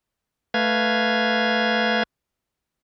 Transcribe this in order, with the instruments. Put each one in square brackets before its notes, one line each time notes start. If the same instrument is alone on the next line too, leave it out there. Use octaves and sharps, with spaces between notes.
[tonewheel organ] A3 B4 F5 G#6